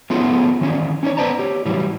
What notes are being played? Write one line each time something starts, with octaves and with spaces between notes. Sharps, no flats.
A3 B3 C#4 E4 F4 G#4
D#3 E3 C#4
C#4 D#4 C5 C#5
B3 B4 C5 D5 A5 A#5
G4 C#5
A2 E3 F#3 G3